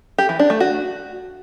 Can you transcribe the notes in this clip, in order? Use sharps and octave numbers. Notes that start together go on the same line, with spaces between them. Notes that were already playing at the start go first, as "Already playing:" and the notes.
G4
E3
D4
A3
F#4